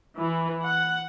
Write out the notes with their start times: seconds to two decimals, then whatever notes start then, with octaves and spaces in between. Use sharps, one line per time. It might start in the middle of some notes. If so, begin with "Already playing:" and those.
0.18 E3
0.64 F#5